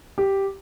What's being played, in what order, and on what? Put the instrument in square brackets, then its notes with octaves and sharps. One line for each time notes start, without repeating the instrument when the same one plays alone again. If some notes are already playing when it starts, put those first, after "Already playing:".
[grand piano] G4